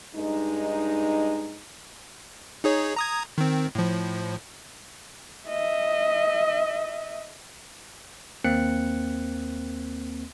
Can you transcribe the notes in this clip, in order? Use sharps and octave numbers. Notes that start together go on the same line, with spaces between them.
G2 G#3 D#4
D#4 G#4 C#5
A#5 D#6 G#6
D#3 C4
A2 F3
D#5 E5
D#2 A#3 C4 F#6 C#7